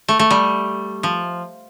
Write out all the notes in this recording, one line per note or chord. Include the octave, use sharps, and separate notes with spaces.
A3
A3
G3
F3